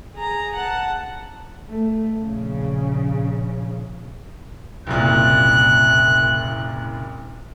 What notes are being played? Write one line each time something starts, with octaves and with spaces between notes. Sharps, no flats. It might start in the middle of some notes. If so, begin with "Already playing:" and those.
G#4 A#5
F#5 A5
A3
A#1 C#3
F#1 C2 A#2 F#6